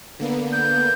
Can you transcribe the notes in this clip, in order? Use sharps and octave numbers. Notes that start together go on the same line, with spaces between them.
D3 A#3 B3
G6